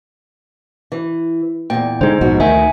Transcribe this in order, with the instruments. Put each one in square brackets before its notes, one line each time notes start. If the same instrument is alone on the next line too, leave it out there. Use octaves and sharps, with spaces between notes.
[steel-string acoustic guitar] E3
[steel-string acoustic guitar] E2 A#2 [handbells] G5
[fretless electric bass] D3 G#3 [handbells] D#4 C5
[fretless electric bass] A#1 G#2 B2 [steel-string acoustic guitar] F#4
[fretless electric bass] D2 [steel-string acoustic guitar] D#3 A3 D#4 [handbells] E5 F#5 G#5